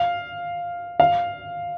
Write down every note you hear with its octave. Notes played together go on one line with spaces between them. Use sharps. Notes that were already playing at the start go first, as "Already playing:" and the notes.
Already playing: F5
F5